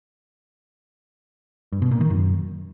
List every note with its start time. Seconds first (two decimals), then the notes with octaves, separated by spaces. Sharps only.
1.72 G2
1.82 B2
1.91 A#2
2.01 D#3
2.10 F#2